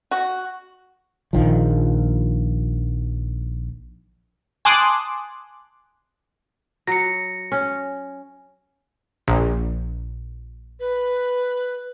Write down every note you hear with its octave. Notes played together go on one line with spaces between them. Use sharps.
F#4
A#1 D#3 F3
G#5 A5 C6 D6 D#6 F#6
F#3 A#6 C#7
C#4
A#1
B4